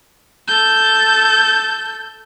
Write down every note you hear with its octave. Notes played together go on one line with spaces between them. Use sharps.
A4 G6